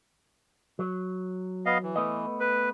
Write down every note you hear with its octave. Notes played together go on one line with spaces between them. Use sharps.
F#3
B3 D#5 F5
E3
A3 B3 D#5
B4